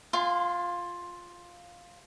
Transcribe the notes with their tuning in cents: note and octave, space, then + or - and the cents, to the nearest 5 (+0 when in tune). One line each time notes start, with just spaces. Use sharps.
F4 +5 G#5 -15 C6 -25